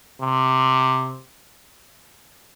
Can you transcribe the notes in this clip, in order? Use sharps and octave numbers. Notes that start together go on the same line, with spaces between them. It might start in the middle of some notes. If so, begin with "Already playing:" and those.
C3